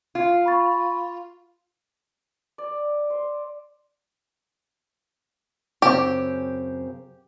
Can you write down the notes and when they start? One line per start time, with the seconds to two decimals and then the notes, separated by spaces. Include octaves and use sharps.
0.15 F4
0.46 B5 C#6 A6
2.58 D5
3.10 C5
5.82 F#2 C#3 C4 G4